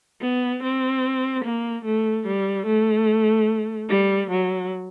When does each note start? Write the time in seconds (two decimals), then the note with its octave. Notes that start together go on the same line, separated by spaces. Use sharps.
0.21 B3
0.63 C4
1.45 A#3
1.85 A3
2.27 G3
2.66 A3
3.90 G3
4.31 F#3